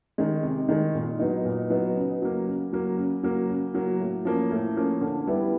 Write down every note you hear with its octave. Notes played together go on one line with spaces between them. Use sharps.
D#3 G#3
C3
D#3 G#3
A#2
F#3 B3 D#4
A#2
F#3 B3 D#4
C#3
F#3 A#3
C#3
F#3 A#3
C#3
F#3 A#3
C#3
F#3 A#3
A2
F3 A#3 C#4
A2
F3 A#3 C#4
D3
G3 B3 E4